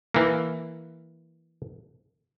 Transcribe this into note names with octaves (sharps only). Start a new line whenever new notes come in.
E3 A#3